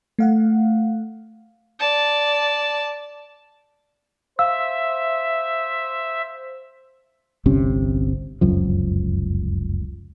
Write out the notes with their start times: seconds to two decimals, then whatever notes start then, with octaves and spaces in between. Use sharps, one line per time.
0.19 A3 F5 F#5
1.79 D5 A5
4.39 C5 E5 F5 E6
7.46 G1 C2 C3 C#4
8.41 F1 C#2 F#2 F3